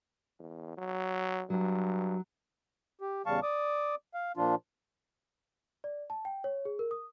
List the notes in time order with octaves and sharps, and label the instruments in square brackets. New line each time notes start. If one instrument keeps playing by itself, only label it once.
[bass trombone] E2
F#3
[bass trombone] G2 [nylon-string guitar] F#3
[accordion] G4
E2 C#3 G3 F5 A5 C#6
D5 D6 D#6
F5
A#2 F3 D4 F4
[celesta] D5
A5
G5
C#5
G#4
A#4
D#6